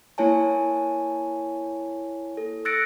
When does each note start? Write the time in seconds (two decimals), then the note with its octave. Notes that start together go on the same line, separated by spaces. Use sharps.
0.18 A#3 E4 C#5 G#5 A5
2.37 A4
2.65 E6 F#6 A6 A#6 C#7 D7